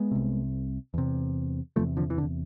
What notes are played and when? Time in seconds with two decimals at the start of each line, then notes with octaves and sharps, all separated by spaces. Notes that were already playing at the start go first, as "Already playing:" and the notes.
Already playing: G#3 B3
0.11 C2 C3
0.94 E2 C3
1.76 E2 C3 F3 A3
1.97 D3 F3
2.10 E3
2.18 D3